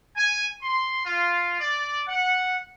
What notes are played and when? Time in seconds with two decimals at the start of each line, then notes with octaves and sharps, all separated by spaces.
0.15 G#5
0.62 C6
1.05 F4
1.60 D5
2.07 F#5